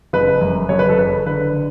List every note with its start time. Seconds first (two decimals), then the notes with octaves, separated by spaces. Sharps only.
0.13 F#1 B4
0.41 F#2
0.69 F#1 C#5
0.79 B4
0.89 A4
0.98 F#1 B4
1.26 D3 B4